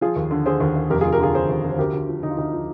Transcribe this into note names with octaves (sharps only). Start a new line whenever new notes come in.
F3 F4 G#4
D#2
D3
D3 G#4 C5
D#2
D#2
F1 G4 A#4
F4 G#4
F1
G4 A#4
D3 F4 G#4
D3 G#4 C5
D#2
D3
C5
D2 G4 A#4
D2
F3
D2 D#4
F4
D2 D#4
F3